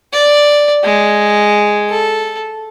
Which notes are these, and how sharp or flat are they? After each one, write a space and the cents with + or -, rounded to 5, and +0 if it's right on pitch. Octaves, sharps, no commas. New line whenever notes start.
D5 +0
G#3 +0
A4 -10